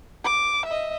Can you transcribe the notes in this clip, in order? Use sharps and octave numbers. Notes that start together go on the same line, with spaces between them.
D6
D#5 E5